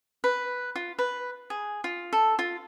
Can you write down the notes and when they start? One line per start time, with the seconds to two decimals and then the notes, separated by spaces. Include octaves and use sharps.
0.24 B4
0.76 F4
0.99 B4
1.50 G#4
1.84 F4
2.13 A4
2.39 F4